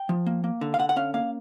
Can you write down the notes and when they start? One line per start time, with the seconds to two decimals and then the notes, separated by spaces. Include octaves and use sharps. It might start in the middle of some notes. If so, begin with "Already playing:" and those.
Already playing: G5
0.09 F3
0.26 A#3
0.44 A#3
0.61 D3
0.74 F5
0.79 D3 F#5
0.89 F#5
0.96 C#4 F5
1.14 A#3 F5